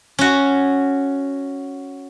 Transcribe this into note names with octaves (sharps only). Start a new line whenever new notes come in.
C#4 F#4